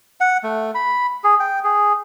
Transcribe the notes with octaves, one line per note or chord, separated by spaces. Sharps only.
F#5
A3
B5
G#4
G5
G#4